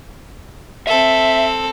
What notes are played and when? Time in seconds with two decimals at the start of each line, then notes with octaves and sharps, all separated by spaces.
0.87 C4 A4 E5